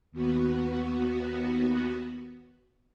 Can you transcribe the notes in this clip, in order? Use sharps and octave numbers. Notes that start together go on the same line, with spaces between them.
D#2 B3 F#4